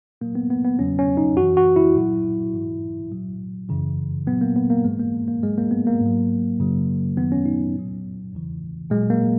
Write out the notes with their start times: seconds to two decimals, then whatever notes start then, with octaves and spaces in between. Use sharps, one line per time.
0.21 A#2 F#3 A#3
0.35 B3
0.50 B3
0.64 B3
0.79 E2 C#3 F#3 C#4
0.99 C#4
1.17 D#4
1.37 F#2 E3 F#4
1.57 F#4
1.76 E4
1.95 A#2 F#3
2.53 G#2 E3
3.11 A#2 F#3
3.69 F#2 C#3 E3
4.26 A#2 F#3 B3
4.41 A#3
4.56 B3
4.70 A#3
4.84 G#2 E3 G#3
4.99 A#3
5.28 A#3
5.43 G#2 F#3 G#3
5.58 A#3
5.71 B3
5.87 A#3
6.01 G#2 F#3
6.59 F#2 C#3 F#3
7.17 F#2 D#3 F#3 B3
7.32 C#4
7.46 D#4
7.75 A#2 F#3
8.32 E2 C#3 E3
8.90 A#2 F#3 G#3
9.10 A#3